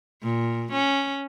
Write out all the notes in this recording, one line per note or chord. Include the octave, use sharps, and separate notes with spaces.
A#2
C#4